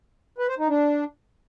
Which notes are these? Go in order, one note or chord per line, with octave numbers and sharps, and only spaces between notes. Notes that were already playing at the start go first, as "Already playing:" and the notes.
B4
C5
D#4
D4